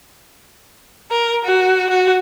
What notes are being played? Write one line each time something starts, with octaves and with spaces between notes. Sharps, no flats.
A#4
F#4
F#4